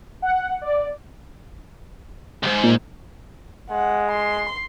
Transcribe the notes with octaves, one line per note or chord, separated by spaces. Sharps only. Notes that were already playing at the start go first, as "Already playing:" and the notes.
F#5
D5
C#2 G#2
A#2
G#3 F#5
C6